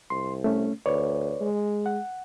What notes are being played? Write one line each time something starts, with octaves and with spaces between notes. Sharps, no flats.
C2 C6
A3 C#4
D2 B4 C#5 D5
G#3
F#5